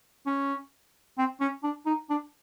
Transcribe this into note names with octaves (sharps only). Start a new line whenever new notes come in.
C#4
C4
C#4
D4
D#4
D4